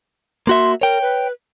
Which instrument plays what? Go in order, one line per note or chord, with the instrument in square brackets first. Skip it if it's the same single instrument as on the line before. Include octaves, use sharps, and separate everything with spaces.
[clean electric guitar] A#3 F#4 E5 [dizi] C6
[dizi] A#4 [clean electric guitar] C#5 G5
[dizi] B4